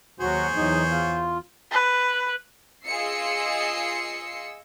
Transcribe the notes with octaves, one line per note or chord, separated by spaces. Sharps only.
D#2 F#3 F#4 G#4 C5 C#5
E2 F#3 D#4
F4
B4
F4 G#4 D#5 E6 C7 C#7